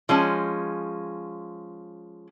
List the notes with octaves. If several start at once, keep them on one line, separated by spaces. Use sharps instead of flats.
F3 G#3 C#4